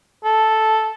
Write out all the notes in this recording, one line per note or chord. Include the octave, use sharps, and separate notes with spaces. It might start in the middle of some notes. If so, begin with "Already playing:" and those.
A4